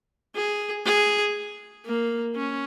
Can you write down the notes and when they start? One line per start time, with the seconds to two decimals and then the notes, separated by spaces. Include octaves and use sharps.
0.35 G#4
0.85 G#4
1.85 A#3
2.35 C#4